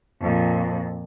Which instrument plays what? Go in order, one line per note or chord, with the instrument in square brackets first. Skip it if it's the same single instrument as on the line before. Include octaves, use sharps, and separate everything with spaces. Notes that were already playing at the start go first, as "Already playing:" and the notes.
[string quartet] F2 A#2